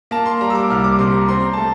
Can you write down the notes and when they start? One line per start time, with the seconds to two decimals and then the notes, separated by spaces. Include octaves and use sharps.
0.11 A#3 A5
0.26 C6
0.41 G3 A#5
0.50 E6
0.55 D6
0.70 C2 F6
0.84 D6
0.99 C3 C6
1.14 A#5
1.28 C4 C6
1.40 A#5
1.53 A3 A5